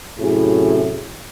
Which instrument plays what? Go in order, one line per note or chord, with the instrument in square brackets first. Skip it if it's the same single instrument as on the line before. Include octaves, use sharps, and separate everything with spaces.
[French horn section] F#2 A2 C3 E4 F#4 G#4